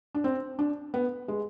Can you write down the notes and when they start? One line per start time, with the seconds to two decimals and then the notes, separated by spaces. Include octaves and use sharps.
0.14 D4
0.24 C4
0.59 D4
0.94 B3
1.28 G#3